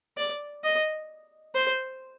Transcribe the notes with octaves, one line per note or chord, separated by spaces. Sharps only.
D5
D#5
C5